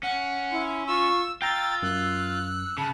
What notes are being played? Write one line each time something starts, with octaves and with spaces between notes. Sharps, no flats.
C#4 F#5
E4 C6
F4 C#6 E6
F4 G5 A#5 E6 A6
F#2 F#6
C#3 A5 B5